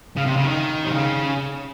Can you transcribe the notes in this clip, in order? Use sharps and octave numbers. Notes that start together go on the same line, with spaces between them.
C#3
C3
C#3
D#3
C3
C#3